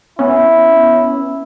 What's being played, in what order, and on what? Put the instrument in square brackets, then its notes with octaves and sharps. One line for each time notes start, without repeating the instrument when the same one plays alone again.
[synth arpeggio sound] B3 C#4 [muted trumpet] E4